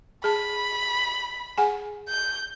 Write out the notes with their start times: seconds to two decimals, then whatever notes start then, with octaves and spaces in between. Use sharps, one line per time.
0.24 G#4 A5 B5
1.58 G#4 F#5 G#5
2.09 G6